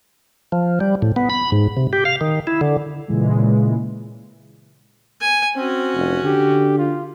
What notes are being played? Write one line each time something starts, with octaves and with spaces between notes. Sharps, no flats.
F3
G3
A2
B3
B5
G#2
C3
G4
F5
D#3
E4
D3
A#2 C#3 E3 G#3
G#5
C4 C#4 F#4
F1
D3 G4
F4